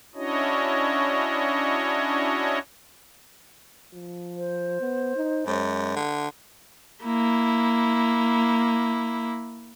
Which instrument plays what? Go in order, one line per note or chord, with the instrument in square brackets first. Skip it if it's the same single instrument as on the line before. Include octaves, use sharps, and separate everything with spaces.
[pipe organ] C#4 D4 E4 F#4 C#5 D#5
[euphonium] F3
[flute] C5
[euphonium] B3
D#4
[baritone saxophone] F#2 [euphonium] G#3
[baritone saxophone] D3
[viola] A#3 E4